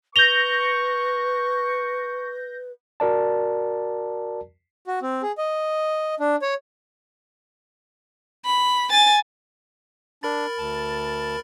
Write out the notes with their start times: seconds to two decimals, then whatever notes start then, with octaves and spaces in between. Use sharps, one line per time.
0.16 B4 C#6 G6 A#6 F7 G7
3.00 F#4 A#4 D5 A5
4.87 F#4
5.02 C4
5.22 G#4
5.38 D#5
6.20 D4
6.42 C#5
8.45 B5
8.90 G#5 A6
10.23 D4 A#4 B5 A6
10.58 D2 A5